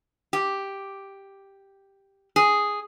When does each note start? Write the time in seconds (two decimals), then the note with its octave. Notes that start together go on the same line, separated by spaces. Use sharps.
0.33 G4
2.36 G#4